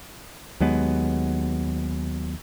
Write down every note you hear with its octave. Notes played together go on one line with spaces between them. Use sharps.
D#2 F#3 G#3 B3